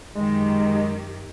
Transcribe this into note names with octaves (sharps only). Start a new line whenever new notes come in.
F#2 D#3 G#3 G4